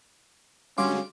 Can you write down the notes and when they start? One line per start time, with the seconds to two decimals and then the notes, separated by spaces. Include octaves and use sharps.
0.78 D3 G3 G#3 C#4 F#4 F5 C6 D6